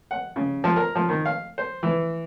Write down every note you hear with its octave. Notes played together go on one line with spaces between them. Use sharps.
F#5
C#3
F3
A#4
F3
D#3
F5
C5
E3